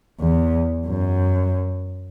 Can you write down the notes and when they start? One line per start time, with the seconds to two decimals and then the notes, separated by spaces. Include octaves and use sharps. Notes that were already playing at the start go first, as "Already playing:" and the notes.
0.20 E2
0.86 F#2